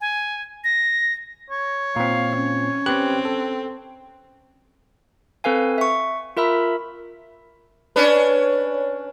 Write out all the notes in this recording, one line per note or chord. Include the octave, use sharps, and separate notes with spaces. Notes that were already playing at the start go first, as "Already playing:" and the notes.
G#5
A#6
C#5
A#2 C4 F5
C#4
C4 G4 B4 F#6
A4
C4 A4 B4 F5 G#5
E5 C#6
F4 A#4 E5 B5 E6
C#4 D4 B4